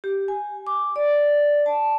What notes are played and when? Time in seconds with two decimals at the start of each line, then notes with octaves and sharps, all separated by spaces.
0.04 G4
0.28 G#5
0.67 D6
0.96 D5
1.66 A5